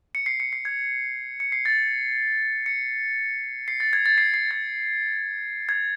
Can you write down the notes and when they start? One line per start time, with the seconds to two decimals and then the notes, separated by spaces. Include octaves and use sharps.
0.15 C#7
0.26 C7
0.40 C#7
0.53 C7
0.65 G#6
1.40 C#7
1.52 C7
1.65 A6
2.66 C#7
3.68 C7
3.80 A6
3.93 G#6
4.06 A6
4.18 C7
4.34 C7
4.51 A6
5.69 G#6